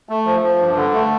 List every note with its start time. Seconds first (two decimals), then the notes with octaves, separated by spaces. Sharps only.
0.09 A3
0.25 F3
0.43 F3
0.60 G2
0.76 D3
0.93 A3